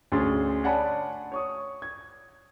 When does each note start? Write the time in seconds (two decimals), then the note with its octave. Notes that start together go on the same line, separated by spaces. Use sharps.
0.12 D2 C#4 G#4 C6 A6
0.64 C#5 D5 F#5 G#5 A5 B5
1.32 C#5 C#6 D#6
1.82 G#6